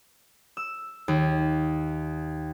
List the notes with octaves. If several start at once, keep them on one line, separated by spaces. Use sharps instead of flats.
E6
D#2